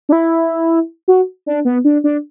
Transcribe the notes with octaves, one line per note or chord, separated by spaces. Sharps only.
D4
E4
F#4
D4
B3
D4
D4